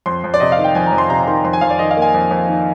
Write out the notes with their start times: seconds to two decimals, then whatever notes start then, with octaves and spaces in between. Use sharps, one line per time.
0.06 F2 C6
0.24 F2
0.34 D5
0.40 C3 D#5
0.52 F5
0.58 D#3
0.64 G5
0.75 F2 G#5
0.86 A#5
0.92 F2
0.98 C6
1.09 C3 A#5
1.27 D#3 C6
1.44 F2 C6
1.53 G#5
1.61 F2 F5
1.70 D5
1.79 D#3 D#5
1.91 F5
1.97 A#3 G#5
2.14 F2
2.31 F2
2.48 D#3